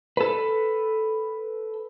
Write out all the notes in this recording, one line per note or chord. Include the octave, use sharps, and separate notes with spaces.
A4 B4